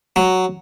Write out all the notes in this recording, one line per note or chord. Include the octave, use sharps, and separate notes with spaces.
F#3